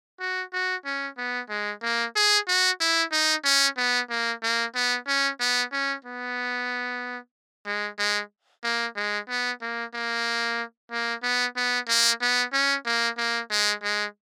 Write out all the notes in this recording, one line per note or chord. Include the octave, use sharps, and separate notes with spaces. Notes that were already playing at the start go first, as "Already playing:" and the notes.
F#4
F#4
C#4
B3
G#3
A#3
G#4
F#4
E4
D#4
C#4
B3
A#3
A#3
B3
C#4
B3
C#4
B3
G#3
G#3
A#3
G#3
B3
A#3
A#3
A#3
B3
B3
A#3
B3
C#4
A#3
A#3
G#3
G#3